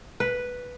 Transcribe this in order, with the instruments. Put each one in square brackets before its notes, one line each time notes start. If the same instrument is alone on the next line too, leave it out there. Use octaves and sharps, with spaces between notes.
[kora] B4